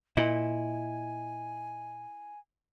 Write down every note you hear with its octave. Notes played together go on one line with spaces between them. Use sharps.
A#2 E4 D#5 G#5